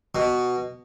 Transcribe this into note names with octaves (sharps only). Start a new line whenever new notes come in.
B2